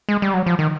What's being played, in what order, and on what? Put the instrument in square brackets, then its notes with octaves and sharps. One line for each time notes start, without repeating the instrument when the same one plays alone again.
[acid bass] G#3
G3
F#3
F3
D#3